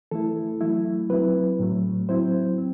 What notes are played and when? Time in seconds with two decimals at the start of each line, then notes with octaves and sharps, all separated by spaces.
0.11 E3 A3 E4 A4
0.61 F#3 A3 E4
1.10 F#3 C4 E4 B4
1.59 A2 F#3 A3
2.09 F#3 C4 E4 C5
2.58 C4